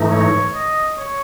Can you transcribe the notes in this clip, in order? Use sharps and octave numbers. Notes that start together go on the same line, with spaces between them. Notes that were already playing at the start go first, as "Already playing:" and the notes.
Already playing: G#2 E3 A3 D#4
C#5
D#5
C#5